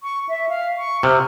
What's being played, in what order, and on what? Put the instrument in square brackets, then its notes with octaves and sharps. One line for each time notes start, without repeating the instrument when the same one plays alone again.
[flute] C#6
E5
F5
C#6
[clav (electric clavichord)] C3 [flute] F6